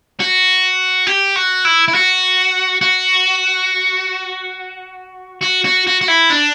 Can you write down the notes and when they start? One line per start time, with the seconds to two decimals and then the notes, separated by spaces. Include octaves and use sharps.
0.20 F#4
1.07 G4
1.36 F#4
1.65 E4
1.88 E4
1.95 F#4
2.81 F#4
5.43 F#4
5.65 F#4
5.87 F#4
6.01 F#4
6.08 E4
6.30 D4